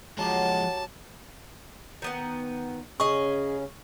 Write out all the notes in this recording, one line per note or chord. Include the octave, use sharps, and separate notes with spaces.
F3 F#3 G#3 G4 A5
D#3 B3 F#5
C#3 C#4 G#4 D#5 C#6